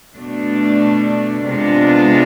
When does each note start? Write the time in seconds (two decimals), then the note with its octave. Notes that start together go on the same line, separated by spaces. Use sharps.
0.15 B2 A3 D4
1.44 C3 G#3 B3 D4 F4